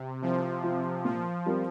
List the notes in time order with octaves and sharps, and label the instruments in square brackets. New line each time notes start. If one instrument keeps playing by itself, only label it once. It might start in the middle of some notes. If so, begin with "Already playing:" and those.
Already playing: [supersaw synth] C3
[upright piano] C2 [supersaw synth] F3
[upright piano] C3 F3
[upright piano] A#2 [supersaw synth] F3
[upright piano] G3 C4 F4 A#4